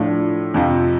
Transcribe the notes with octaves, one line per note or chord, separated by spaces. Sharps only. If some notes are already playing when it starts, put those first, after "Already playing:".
Already playing: A2 F3 A3 D4
F2 C3 F3